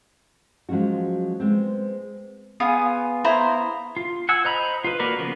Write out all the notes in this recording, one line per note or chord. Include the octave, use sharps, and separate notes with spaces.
F3 F#3 G#3 C#4 F#4
G#3 B3 C4
B3 F4 G#4
E4 C5 A#5
F4
F#5 G#5 E6
C5 D#5 A#5 B5
F4 B4
A#3 F#4 A#4 B4 D5
C#3 F3 B3